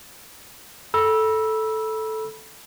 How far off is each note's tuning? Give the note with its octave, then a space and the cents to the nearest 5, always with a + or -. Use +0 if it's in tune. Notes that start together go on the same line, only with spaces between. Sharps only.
A4 -5 B5 -30 E6 +0